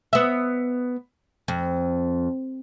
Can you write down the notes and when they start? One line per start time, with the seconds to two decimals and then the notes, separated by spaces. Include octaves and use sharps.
0.13 B3 E5
1.48 F2